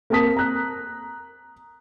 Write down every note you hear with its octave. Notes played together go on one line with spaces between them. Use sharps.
A#3 C4 A#4 A5 D#6 B6
A#5 F#6